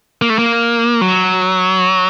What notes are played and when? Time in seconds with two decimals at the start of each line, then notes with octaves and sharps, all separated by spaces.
0.22 A#3
0.30 A3
0.39 A#3
1.01 F#3